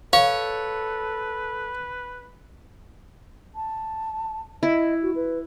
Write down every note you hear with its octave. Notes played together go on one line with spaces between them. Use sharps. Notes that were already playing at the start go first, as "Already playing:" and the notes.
A4 B4 C#5 F5
A5
E4 D#5
F#4
B4